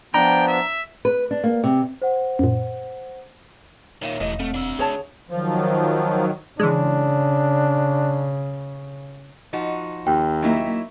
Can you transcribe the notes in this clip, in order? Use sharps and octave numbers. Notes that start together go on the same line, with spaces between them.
F3 B3 D4 G5 A#5
E5
B4
D4
A#3
C3
C5 F#5
F#2 A#2
A#2 D#3 C#5 E5 F5
E1 F2 E3 A3 D#5
A3 C4
D4 E5
D3 G#4 C#5 A5
D#3 F3 F#3
C#3 E3 G#3 D4
F3 D#4 F#4
D#2 G5
F#3 A#3 D#4 E4 E5